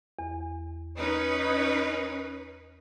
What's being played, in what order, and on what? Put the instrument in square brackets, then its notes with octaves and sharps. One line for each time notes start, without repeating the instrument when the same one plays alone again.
[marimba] E2
[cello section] C#4 D#4 B4